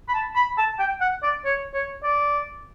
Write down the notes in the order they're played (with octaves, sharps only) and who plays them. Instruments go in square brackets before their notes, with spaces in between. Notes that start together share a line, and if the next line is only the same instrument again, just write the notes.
[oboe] B5
A5
B5
A5
G5
F#5
D5
C#5
C#5
D5